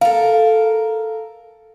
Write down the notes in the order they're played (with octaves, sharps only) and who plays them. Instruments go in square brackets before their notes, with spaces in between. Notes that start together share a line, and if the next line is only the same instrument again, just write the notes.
[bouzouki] A4 A#4 [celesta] F5